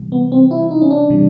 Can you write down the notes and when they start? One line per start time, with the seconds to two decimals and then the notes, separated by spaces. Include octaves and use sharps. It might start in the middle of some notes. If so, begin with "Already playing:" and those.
Already playing: C3 E3 G3
0.12 B3
0.32 C4
0.51 E4
0.71 D#4
0.82 C#4
0.91 D4
1.10 C3 E3 G3